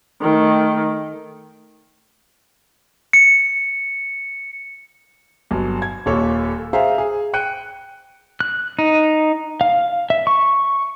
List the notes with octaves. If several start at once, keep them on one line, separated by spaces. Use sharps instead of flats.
D#3 A3
C#7
G1 F#3
G#6
D#1 D#2 A#2 A4 C#5
G#4 C5 E5 F5 A#5
G#4
G5 F#6 C#7 D#7
F#6
D#4
F5
E5
C#6